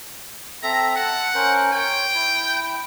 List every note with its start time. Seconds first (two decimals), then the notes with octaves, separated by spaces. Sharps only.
0.63 C4 A4 E5 A#5
0.96 F#5 A5
1.35 C#4 A#4 C5
1.72 C#5 G5
2.15 E4